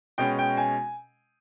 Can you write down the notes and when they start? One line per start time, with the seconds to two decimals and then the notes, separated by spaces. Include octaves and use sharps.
0.18 B2 G#3 C#4 G5
0.39 G5
0.57 G#5